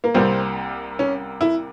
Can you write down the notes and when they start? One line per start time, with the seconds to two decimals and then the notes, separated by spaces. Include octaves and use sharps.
0.04 A#3
0.14 C2 C3 G3 A#3 C4
0.99 C#4
1.41 E4